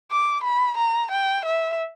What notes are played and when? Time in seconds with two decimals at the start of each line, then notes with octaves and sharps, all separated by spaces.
0.12 D6
0.44 B5
0.78 A#5
1.12 G5
1.45 E5